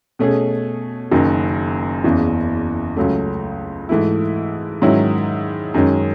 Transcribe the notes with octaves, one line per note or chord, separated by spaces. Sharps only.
B2 A3 C#4 G#4
F#1 F#2 D#3
F#1 E2 C#3 E3
C#2 C#3 F#3 A3
G#2 E3 A3 E4
G#2 D#3 F#3 C#4 E4
F#2 D#3 G#3 C#4